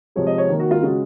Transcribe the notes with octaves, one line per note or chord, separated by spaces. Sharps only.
C3 F3 G#3 C#5
D#5
C#5
D#3 A#3
F#4
F4
C#3 G#3 F#4